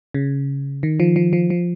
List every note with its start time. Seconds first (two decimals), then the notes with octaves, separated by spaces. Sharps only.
0.14 C#3
0.83 D#3
1.00 F3
1.16 F3
1.33 F3
1.50 F3